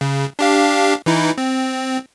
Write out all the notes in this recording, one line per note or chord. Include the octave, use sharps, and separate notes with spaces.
C#3
D4 G4 F5
E3 D#4 E4
C4